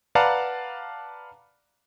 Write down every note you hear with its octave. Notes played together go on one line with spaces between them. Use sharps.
B4 D5 F5 F#5 A5 A#5